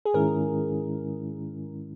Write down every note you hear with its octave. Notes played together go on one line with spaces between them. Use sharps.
G#4
G#2 D#3 G#3 C#4 E4 A#4